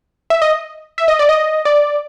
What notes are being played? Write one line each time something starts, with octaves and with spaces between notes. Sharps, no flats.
E5
D#5
E5
D#5
D5
D#5
D5